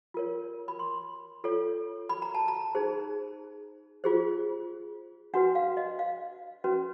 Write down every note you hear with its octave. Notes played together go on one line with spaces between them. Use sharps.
F4 A#4 C#5
B5
C6
F4 A4 C#5
B5
A#5
A5
A#5
D#4 G#4 C5
F4 G#4 C5
D4 F#4 B4 F#5
F5
D#5
F5
C#4 F#4 B4